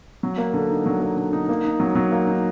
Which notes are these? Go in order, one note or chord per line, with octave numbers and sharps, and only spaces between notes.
F#3
A#3
D3
D#4
F#3
A#3
D3
D#4
A#3
D#4
F#3
F#3
A#3
D#4